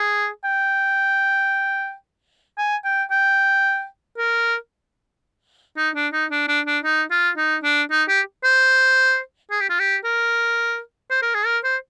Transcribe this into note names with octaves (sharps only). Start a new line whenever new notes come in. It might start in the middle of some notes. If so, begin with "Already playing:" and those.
Already playing: G#4
G5
G#5
G5
G5
A#4
D#4
D4
D#4
D4
D4
D4
D#4
F4
D#4
D4
D#4
G4
C5
G#4
G4
F4
G4
A#4
C5
A#4
G#4
A#4
C5